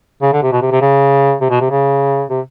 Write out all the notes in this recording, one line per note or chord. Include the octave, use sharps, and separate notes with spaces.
C#3
D3
C3
B2
C3
C3
C#3
C3
B2
C3
C#3
C3